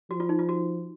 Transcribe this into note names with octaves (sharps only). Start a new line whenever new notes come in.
F3 F#4
F4
D#4
F4
F#4